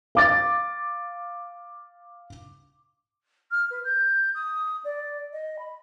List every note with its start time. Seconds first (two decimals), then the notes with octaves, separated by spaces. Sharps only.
0.15 F5 D6 A6
3.51 F6
3.71 B4
3.84 G6
4.35 D#6
4.84 D5
5.33 D#5
5.59 B5